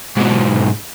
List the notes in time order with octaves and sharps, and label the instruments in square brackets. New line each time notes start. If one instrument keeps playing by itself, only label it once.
[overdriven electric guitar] G#2 B2